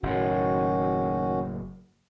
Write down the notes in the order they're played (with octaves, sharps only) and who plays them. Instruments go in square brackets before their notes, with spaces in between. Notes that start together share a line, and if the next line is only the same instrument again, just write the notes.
[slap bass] F#1 A2 [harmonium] D#3 C#4 F#4